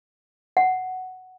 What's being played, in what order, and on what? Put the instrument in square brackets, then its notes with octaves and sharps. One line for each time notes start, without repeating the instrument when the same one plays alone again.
[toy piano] F#5